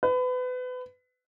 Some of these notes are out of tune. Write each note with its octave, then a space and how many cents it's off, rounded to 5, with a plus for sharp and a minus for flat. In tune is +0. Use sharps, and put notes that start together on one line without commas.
B4 +30